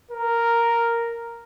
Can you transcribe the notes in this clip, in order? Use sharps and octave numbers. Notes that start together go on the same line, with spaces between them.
A#4